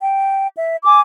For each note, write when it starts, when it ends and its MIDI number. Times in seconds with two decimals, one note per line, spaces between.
0.01 0.47 79
0.57 0.76 76
0.85 1.00 80
0.85 1.00 86